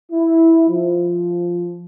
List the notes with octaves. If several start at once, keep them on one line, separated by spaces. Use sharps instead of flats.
E4
F3